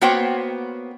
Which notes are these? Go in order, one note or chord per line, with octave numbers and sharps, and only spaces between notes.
A#3 B3 F#4 C5 C#5 G5